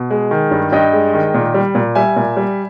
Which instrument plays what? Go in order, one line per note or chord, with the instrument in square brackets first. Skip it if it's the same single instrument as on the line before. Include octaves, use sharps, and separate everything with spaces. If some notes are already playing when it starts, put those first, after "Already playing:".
Already playing: [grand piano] B2
G#3
D#3
G2
G2 D#5 G5
G#3
D#3
A#2
G3
A#2
G3 E5 G#5
A#2
G3